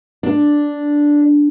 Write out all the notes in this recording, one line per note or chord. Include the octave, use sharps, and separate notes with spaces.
D4